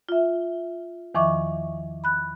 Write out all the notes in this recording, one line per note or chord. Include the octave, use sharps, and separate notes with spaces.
F4 E5
E2 D#3 F3 E5 C#6 D6
B5 F#6